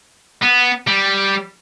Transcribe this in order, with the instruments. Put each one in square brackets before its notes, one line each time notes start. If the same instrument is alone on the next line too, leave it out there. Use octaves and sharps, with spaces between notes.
[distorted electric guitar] B3
G3